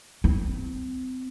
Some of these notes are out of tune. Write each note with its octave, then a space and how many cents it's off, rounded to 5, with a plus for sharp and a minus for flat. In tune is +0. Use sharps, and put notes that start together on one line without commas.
C4 -35